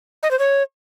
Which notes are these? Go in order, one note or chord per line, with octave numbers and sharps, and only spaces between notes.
D#5
C5
C#5